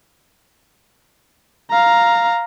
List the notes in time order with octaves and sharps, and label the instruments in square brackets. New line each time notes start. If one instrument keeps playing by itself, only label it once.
[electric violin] F5 A#5